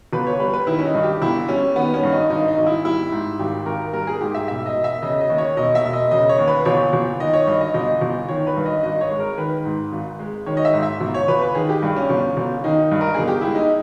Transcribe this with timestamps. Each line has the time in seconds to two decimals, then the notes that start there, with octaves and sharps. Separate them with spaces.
0.13 G1 B4
0.27 C#5
0.40 G3 B4
0.53 B4
0.67 D#3 E4
0.79 C#4
0.85 D#4
0.94 G2
1.03 G4
1.22 G1 E4
1.49 G3 C#4
1.76 D#3 B3
1.94 C#4
2.03 G2
2.12 D#4
2.30 G#1 D#4
2.48 D#4
2.58 G#1
2.66 E4
2.85 G3 E4
3.12 G#2
3.39 G#1 G4
3.66 G#1 A#4
3.93 G3 A#4
4.07 G#4
4.21 G#2 G4
4.35 E5
4.48 E1 E5
4.66 D#5
4.75 E1
4.84 E5
5.02 C#3 D#5
5.21 D#5
5.30 D#2
5.38 C#5
5.56 E1 D#5
5.75 E5
5.84 E1
5.93 D#5
6.11 C#3 D#5
6.29 C#5
6.38 D#2
6.48 B4
6.65 G1 C#5
6.93 G1
7.20 D#3 D#5
7.33 C#5
7.47 G2 D#5
7.61 D#5
7.74 G1 D#5
8.01 G1
8.29 D#3 C#5
8.47 B4
8.56 G2
8.65 D#5
8.83 G#1 D#5
9.01 C#5
9.10 G#3
9.20 A#4
9.37 D#3 B4
9.65 G#2
9.92 G#1
10.19 G#3
10.46 D#3 C#5
10.57 D#5
10.65 E5
10.74 G#2
10.83 E5
11.01 G1
11.14 C#5
11.28 G1 B4
11.42 B4
11.55 D#3 G#4
11.69 G4
11.82 G2
11.96 C#4
12.10 G1
12.37 G1
12.64 D#3 D#4
12.91 G2
13.01 A#4
13.14 G1 G#4
13.28 G4
13.41 G#3 E4
13.55 D#4